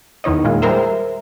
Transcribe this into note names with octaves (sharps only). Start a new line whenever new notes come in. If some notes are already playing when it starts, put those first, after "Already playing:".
E2 D#3 E4 C#5 D#5
A#2 D#3 G#3 F4
G3 G#3 A#4 C5 E5